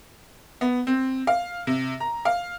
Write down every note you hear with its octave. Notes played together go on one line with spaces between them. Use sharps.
B3
C4
F5
C3
A#5
F5